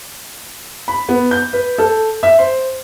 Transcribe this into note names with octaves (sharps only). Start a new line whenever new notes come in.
B5
B3
G6
B4
A4
E5
C5